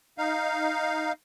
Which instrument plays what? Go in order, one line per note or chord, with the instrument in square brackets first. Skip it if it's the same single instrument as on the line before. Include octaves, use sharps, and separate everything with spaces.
[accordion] D#4 F5